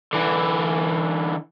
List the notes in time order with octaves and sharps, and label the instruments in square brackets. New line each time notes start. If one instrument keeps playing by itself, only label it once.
[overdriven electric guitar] D3 E3